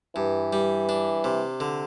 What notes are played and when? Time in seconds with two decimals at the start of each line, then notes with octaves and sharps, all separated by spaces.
0.15 G2 E3
0.53 G3
0.89 D4
1.24 C3
1.60 D3